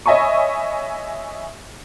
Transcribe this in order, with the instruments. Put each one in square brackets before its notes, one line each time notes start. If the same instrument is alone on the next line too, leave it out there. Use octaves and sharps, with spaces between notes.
[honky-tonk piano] C#5 D#5 E5 G#5 B5 C#6